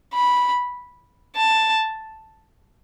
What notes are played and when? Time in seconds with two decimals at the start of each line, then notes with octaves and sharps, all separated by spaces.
0.14 B5
1.36 A5